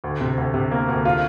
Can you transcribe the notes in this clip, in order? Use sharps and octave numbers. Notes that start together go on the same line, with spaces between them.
D2
C3
D2
C3
A#3
D2
F4